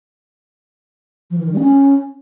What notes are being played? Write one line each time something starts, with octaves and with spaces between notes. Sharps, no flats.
F3
E3
D#3
G3
C#4